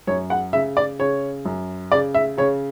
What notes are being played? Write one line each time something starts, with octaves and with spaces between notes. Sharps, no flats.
F#2 C#5
F#5
C#3 E5
D5
C#3 C#5
F#2
C#3 D5
E5
C#3 C#5